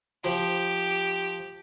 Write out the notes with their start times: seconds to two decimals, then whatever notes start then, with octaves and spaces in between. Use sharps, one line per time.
0.24 F3 G4